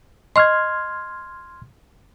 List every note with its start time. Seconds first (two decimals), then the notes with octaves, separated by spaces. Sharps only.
0.36 D#5 C6 C#6 F6 G#6